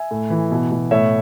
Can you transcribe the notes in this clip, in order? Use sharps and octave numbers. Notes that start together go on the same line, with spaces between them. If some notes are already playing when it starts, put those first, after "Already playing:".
Already playing: E5 G#5
A2
E3
B2
B2
A2 C#5 E5